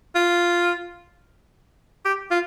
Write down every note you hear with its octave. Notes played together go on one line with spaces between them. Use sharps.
F4
G4
F4